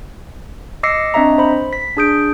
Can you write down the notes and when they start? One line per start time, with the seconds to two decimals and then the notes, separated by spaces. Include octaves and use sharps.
0.83 D#5 D6 E6 A#6 C7 C#7
1.14 C4 D4 D#5 E5 A#5
1.38 C5 B5
1.73 B6
1.97 D4 G#4 D#6 G6 D7